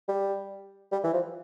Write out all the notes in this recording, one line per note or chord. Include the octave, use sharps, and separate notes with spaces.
G3
G3
E3
F3